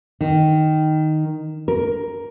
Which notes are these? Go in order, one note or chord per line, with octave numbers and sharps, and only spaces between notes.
D#3
A#4